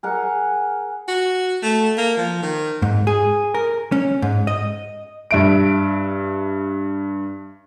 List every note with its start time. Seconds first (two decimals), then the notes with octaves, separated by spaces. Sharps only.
0.03 G#4 A#4 F#5
1.08 F#4
1.63 A3
1.98 A#3
2.17 F3
2.43 D#3
2.82 G#2
3.07 G#4
3.55 A#4
3.92 C#4
4.22 G#2
4.47 D#5
5.31 G2 E5 D7